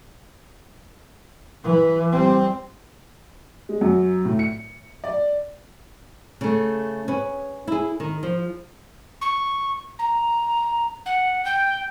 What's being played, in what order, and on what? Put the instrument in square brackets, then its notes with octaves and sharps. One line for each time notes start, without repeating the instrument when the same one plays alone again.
[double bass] E3
G3 C4
[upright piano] G#3
F#2
A2
C#7
D5
[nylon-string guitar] C#3 A3
C#4 G#4 B4
E4 G#4
D#3
F3
[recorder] C#6
A#5
F#5
G5